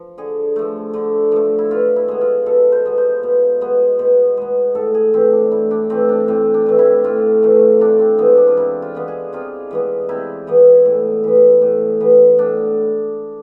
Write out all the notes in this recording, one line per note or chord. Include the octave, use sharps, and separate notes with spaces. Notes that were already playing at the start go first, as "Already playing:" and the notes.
Already playing: F3
D3 G#4
F3 A3
D3
F3 A3
E4
B2 F4
E4
G#3 B3
F4
B2 A4
C5
G#3 B3
C5
B2
G#3 B3
B2
G#3 B3
A2 A4
G#4
E3 A3 C4
D4
A2 E4
D4
E3 A3 C4
D4
A2 C4
D4
E3 A3
E4
A2 F4
E3 A3
C3 D4
C4
E3 G#3 B3 C4
D4
F4
C3 E4
F4
E3 G#3 B3
G#4
C3 F4
E3 G#3 B3
C3 E4
E3 G#3 B3
A2
E3 B3
A2
E3 B3
A2 D4